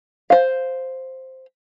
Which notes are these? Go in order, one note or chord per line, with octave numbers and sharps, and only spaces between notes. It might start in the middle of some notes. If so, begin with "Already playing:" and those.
C5 F5